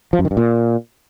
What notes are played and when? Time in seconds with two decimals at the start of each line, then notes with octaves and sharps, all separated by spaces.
0.13 F3
0.19 F#2
0.25 D#3
0.31 G2
0.37 A#2